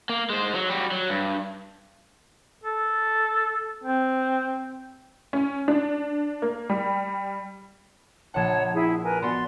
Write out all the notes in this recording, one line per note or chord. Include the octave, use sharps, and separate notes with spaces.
A#3
G#3 C5
F#3
G3 F#4
F#3
G2
A4
C4
C#4
D4
A#3
G3
A#1 C#5 F#5 A5
E4 G#4
A#4 B4 G#5
B3 F#4 D5 C6